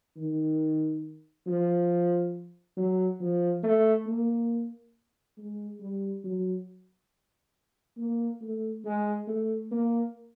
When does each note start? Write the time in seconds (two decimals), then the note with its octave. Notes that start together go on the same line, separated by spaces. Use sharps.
0.17 D#3
1.47 F3
2.77 F#3
3.20 F3
3.63 A3
4.06 A#3
5.37 G#3
5.80 G3
6.24 F#3
7.97 A#3
8.41 A3
8.85 G#3
9.27 A3
9.71 A#3